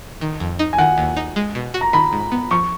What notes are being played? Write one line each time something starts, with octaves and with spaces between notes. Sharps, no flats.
D#3
F2
D#4
G#5
D#3 F#5
D#2
D#4
G#3
B2
F#4
A#5
D#3 B5
G#2
B3
F3 C#6